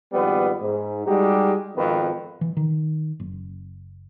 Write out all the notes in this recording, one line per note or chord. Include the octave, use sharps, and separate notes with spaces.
G#1 F2 G3 B3 B4
G#2
G3 G#3 D#4 F#4 G4
G#1 F2 D#3 B3 B4
E3
D#3
F#1